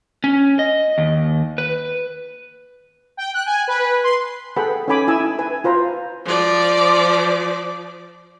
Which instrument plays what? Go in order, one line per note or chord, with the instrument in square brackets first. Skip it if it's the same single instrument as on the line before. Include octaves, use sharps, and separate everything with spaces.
[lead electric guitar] C#4
D#5
D#2
B4
[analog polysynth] G5
F#6
G#5
B4
C6
[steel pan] G#4 A4 B4 F#5 G5 B5
C#4 D#4 A4 G#5 B5 D6
E4 G#5 E6
E4
B4 G#5
F4 B4 C5 A#5
[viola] F3 D5